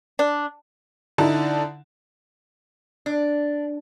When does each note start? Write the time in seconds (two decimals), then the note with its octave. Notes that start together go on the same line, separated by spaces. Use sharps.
0.19 D4
1.18 D3 D#4 E4 A5
3.06 D4